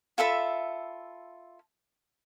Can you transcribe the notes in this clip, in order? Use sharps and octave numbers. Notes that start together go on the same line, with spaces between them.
F4 A4 E5 B5